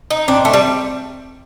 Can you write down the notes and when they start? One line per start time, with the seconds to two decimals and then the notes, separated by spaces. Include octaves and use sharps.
0.11 D#4
0.28 C4 D4
0.45 A3
0.53 G3